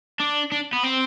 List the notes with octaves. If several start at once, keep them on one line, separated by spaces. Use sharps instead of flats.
D4
D4
B3
C4